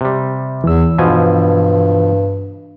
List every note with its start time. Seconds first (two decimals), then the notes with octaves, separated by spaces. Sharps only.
0.01 C3 G3
0.64 E2 E3 E6
0.98 G2 B2 F3 G#5